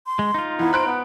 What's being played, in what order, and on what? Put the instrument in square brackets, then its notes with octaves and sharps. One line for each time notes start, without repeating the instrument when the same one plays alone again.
[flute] C6
[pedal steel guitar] G#3
D#4 F4
[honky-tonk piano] E3 [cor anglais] B3 [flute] A#5
[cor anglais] C5 [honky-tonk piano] B5 F#6 D7
[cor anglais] B3